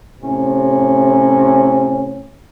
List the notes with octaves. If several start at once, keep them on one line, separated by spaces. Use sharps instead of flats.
A2 C3 C#4